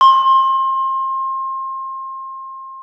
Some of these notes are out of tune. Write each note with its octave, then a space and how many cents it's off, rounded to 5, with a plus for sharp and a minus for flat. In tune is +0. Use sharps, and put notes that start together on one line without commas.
C6 +30